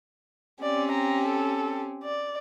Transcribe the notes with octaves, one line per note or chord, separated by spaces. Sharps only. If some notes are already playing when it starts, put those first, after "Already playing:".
C4 C#4 G4 D5
A#5
A4
D5